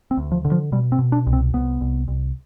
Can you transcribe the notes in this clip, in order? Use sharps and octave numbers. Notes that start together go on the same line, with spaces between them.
C4
D2
F3
D3
F3
B2 G3
C4
B2
D4
C2
C4
C2 B3
C2
C2